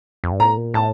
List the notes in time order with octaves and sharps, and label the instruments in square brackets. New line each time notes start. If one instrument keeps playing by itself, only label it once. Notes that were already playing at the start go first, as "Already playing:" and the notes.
[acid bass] F2
G2
[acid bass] A2 [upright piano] A#5
[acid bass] A#2
[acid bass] A2 [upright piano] A5